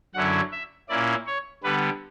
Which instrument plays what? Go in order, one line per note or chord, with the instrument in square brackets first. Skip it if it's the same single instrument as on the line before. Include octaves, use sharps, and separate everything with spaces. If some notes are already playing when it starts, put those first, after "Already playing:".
[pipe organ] F#2 D3 F#3 C#4 E4 F#5
E5
A#2 A#3 C#4 E4 D5
C#5
D3 G3 B3 B4